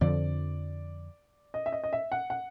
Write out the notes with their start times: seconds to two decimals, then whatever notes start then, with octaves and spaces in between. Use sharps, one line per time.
0.01 F2 D3 F3 D5
1.54 D#5
1.66 E5
1.72 D#5
1.84 D#5
1.93 E5
2.12 F#5
2.30 F#5